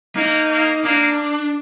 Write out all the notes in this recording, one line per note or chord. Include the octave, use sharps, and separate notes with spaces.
A#3 D#4
A#3
A#3 D4